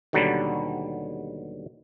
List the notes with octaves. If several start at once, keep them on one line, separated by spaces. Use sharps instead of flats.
D#2 B2 D3 F#3 G3